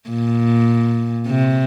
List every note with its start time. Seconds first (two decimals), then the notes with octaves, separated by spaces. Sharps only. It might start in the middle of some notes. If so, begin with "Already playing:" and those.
0.10 A#2
1.28 C3